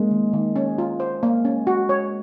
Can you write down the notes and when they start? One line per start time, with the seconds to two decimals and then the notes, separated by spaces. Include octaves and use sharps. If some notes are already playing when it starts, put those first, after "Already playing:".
Already playing: G#3 A#3 C#4
0.11 D#3
0.33 D#3
0.56 C#4
0.78 F4
1.00 C5
1.23 A#3
1.45 C#4
1.67 F#4
1.89 C#5